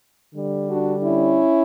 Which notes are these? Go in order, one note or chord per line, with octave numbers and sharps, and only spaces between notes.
D3 G3
D4 F#4
C#4 E4